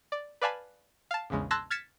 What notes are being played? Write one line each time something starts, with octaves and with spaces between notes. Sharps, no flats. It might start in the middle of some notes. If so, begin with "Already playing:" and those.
D5
B4 D5 F5 G#5 A5 B5
F5 A5
A#1 E2 C#3 G#3
A5 C6 E6 F#6 G#6 A#6
F6 G#6 A6 B6 C#7 E7